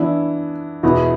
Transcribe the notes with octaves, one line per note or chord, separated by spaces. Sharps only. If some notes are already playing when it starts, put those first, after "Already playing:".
Already playing: E3 B3 D4 E4
E2 B2 B3 E4 F#4